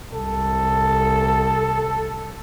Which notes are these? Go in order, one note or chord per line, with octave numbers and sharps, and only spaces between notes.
C2 A4